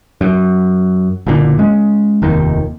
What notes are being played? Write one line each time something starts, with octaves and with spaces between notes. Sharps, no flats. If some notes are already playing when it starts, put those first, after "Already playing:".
F#2
F#1 A#2 D3
G#3 C#4
F1 D#2 D#3